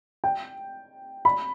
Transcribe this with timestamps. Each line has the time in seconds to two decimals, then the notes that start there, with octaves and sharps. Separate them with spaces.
0.24 G5
1.25 B5